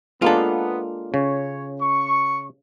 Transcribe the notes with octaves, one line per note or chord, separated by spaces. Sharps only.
G#3 A#3 B3 D4 F4 A4
C#3 C#5
C#6